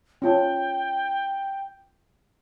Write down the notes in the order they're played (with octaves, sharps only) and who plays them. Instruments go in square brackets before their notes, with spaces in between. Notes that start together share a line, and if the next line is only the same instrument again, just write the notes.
[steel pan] C#4 F4 A5 [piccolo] G5